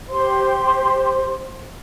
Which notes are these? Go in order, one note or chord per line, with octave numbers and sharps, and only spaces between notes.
G4 C5 C6